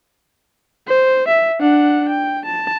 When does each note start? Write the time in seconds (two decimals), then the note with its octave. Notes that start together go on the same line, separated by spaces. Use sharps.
0.87 C5
1.28 E5
1.61 D4 F#5
2.09 G5
2.45 A5